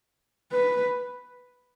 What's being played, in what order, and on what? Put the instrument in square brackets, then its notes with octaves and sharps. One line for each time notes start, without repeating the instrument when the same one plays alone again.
[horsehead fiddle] B4